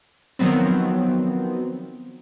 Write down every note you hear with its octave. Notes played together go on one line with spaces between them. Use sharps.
D#3 F3 F#3 B3 C4